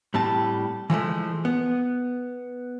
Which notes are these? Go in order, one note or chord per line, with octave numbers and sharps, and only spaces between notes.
A2 G3 C4 A5
E3 F3 G#3 A3
B3